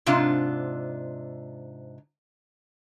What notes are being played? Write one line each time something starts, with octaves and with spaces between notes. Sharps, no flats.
G#2 C3 D4 F4